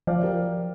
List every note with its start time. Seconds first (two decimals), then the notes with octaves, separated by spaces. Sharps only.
0.07 F3 D5 F5
0.22 G4 A#4